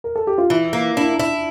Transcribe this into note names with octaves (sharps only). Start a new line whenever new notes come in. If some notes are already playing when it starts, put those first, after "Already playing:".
A#4
A4
G4
F4
E3 E4
A#3
D4 E4
E4